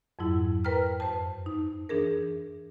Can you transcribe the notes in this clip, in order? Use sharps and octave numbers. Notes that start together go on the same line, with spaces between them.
F2 G#2 F#3 E4
A#4 B4 G5 A#5 F6
F#2 C5 A5
D#4
E3 D4 G#4 A#4